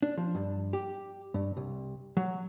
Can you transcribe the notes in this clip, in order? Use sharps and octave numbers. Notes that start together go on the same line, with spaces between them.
D4
F3
G2
G4
G2
C2
F#3